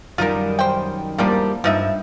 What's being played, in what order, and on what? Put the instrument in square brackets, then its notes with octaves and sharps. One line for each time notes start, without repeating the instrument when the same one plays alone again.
[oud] F#2 D#3 G3 [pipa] F4 A#4
[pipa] C5 G5
[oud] E2 G3 A#3 [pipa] F3 C4 D4
[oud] G2 [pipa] F3 D#4 E5